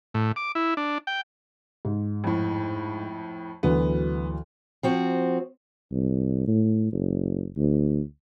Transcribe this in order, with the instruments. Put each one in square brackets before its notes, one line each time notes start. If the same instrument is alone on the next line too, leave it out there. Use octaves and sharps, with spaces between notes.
[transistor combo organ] A2
D6
E4
D4
G5
[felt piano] G#2
[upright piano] F2 A2
[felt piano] D2 E3 F#3 [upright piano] B3
[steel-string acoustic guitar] F3 C4 F#4
[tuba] C2
A2
F#1
D2